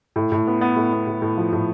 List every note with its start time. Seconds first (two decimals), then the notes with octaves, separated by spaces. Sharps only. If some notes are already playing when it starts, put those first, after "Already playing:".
0.16 A2
0.32 A2
0.47 B3
0.61 B3
0.76 A2
0.93 B3
1.07 A2
1.22 A2
1.38 F3
1.53 A2